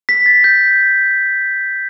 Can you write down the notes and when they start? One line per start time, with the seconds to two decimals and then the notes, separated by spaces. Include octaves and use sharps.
0.09 B6
0.26 A6
0.44 G6